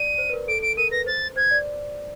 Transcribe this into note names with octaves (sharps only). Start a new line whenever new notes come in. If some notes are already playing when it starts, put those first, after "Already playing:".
Already playing: D5 D#7
C5
B4
A#4
A4 D7
D7
A#4 D#7
B4 A#6
C5 A6
C5 G#6
D5